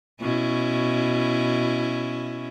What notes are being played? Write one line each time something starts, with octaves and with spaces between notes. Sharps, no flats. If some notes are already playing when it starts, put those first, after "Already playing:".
B2 C#4 E4